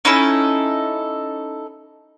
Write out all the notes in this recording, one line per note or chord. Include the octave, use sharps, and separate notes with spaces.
C#4 D#4 E4 A4